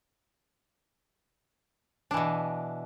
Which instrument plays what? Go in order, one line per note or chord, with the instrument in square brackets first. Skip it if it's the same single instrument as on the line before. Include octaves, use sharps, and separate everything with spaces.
[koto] D4
E3
B2